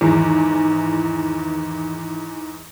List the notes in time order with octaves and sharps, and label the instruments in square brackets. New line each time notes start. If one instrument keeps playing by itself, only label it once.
[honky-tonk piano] E2 G#2 E3 [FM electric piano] D#3